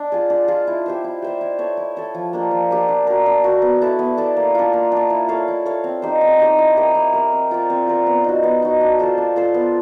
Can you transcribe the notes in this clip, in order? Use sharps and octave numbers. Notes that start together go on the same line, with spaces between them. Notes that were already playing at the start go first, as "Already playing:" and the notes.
Already playing: D4
F4 G#4
D4
F4 G#4
E4
G4 C5 E5
E4
G4 C5 E5
E4
A4 C#5 E5
E4
A4 C#5 E5
F3
A#3 D4 G4
F3
A#3 D4 G4
D4
F#4 A#4
D4
F#4 A#4
B3
E4 A4 D5
B3
E4 A4 D5
A#3
D4 F4
A#3
D4 F4
E4
A4 C#5 F5
E4
A4 C#5 F5
C4
D#4 G4 C5
C4
D#4 G4 C5
E4
G4 A#4 D#5
E4
G4 A#4 D#5
C4
F4 A#4 D5
C4
F4 A#4 D5
B3
D#4 F#4
B3
D#4 F#4
D4
F4 A4 C5
D4
F4 A4 C5
B3